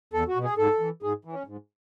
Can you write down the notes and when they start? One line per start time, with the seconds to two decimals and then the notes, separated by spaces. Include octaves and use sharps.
0.13 E2 A4
0.28 F#4
0.36 B2
0.44 G#4
0.58 G#2 A4
0.80 E3
1.03 G#2 G#4
1.25 E3
1.33 C#4
1.47 G#2